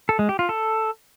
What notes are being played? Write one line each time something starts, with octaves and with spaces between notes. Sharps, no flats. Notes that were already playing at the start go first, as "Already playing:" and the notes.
A4
G#3
G4
F4
A4